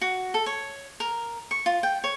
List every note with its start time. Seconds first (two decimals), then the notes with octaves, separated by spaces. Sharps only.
0.01 F#4
0.34 A4
0.46 C#5
1.00 A#4
1.51 C#6
1.66 F4
1.83 G5
2.04 C#5